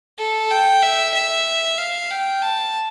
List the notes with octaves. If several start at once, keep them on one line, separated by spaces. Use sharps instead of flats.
A4
G5
E5
E5
F5
G5
A5